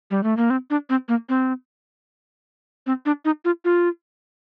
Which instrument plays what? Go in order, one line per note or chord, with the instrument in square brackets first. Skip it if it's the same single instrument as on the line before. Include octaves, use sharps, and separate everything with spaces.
[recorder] G3
A3
A#3
C4
D4
C4
A#3
C4
C4
D4
D#4
F4
F4